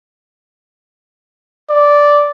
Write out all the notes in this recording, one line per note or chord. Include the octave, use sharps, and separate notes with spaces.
D5